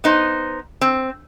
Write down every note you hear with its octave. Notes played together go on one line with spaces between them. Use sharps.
B3 D#4 C5
C4